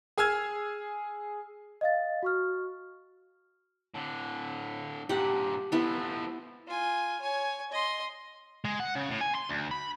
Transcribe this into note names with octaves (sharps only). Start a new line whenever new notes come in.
G#4 G#5 E6 F6 G#6
D#5 F5 A6
F#4 C#6 F6
A2 D3
G2 A#2 G4 F#5
F3 A3 B3 E4
F4 G#5
C#5 G#5
D#5 C6
G#3
F#5
C#3
A2
G#5
C6
D2
B5